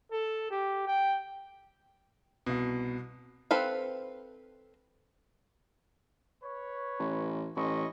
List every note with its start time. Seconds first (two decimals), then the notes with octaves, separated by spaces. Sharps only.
0.11 A4
0.50 G4
0.87 G5
2.46 C2 B2
3.51 C4 A4 B4 F5
6.41 B4 C#5
7.00 A1
7.56 A1 E4 D#5 C#6